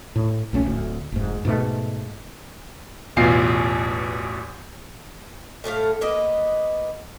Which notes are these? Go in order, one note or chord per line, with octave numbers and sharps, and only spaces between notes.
A2
A#1 A3 C4 C#4
D1 D2
F1 G#2
G#2 B2 D3 A3
A1 E2 B2 F4 G#5 C7
A2 A3 F#4 F5
A#3 B3 D#5